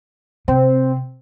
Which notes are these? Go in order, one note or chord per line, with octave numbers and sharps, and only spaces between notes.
C3 C4